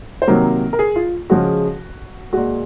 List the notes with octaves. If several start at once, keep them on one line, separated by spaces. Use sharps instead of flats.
C5
C3 D#3 F#3 A#3 A#4
A#4
G#4
F4
C#3 F3 G#3 F#4
A#2 G#3 F#4